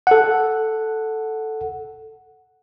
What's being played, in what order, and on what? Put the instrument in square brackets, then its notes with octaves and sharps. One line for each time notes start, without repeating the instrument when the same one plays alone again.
[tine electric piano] A4 F#5